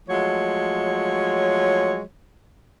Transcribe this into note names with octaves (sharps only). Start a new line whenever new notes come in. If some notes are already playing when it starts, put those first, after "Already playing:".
F3 F#3 G#3 A3 C#5